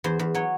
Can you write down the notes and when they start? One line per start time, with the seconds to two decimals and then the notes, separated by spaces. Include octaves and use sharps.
0.04 E2 C5
0.19 E2
0.35 F#3 C#5